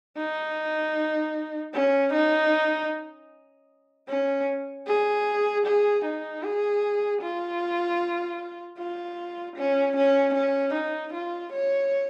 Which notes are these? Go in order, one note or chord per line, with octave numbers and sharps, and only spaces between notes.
D#4
C#4
D#4
C#4
G#4
G#4
D#4
G#4
F4
F4
C#4
C#4
C#4
D#4
F4
C#5